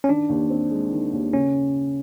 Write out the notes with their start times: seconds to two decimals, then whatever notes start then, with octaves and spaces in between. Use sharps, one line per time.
0.04 C#4
0.09 D#3 D4
0.29 D#2
0.50 C4
0.71 G#3
0.92 D#3
1.13 D#2
1.33 C#3 C#4